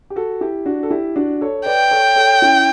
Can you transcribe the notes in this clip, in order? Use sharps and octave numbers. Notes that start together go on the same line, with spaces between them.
G4
F#4 A4
E4 G4
D4 F#4
A4
E4 G4
D4 F#4
A4 C#5
B4 D5 G5
A4 C#5
A4 C#5
C#4 E4